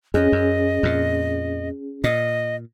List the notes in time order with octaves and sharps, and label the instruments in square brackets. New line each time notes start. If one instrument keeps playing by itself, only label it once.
[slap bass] F2 [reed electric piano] C#4 G#4 [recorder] D#5
[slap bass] F#2
F2 A#2
[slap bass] A#2 [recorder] D#5